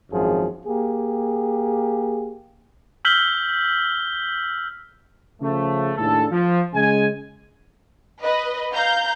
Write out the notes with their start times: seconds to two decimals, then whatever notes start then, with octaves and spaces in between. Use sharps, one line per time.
0.12 G#1 F#2 F3 G#4
0.66 A#3 G4 G#4
3.05 E6 F6 G6 B6 F#7 G7
5.41 C#3 F3 A3
5.97 D#2 A2 C#3 D4 A4
6.30 F3
6.73 C#3 G#3 G#5
8.22 B4 D#5
8.73 F5 A#5 G6